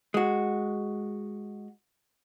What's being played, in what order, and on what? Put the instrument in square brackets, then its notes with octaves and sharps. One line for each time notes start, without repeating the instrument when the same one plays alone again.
[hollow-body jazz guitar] G#3 F#4